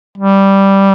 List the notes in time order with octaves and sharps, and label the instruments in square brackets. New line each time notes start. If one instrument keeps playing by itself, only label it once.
[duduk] G3